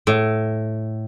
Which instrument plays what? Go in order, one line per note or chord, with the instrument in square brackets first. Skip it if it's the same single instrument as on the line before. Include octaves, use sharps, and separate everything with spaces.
[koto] A2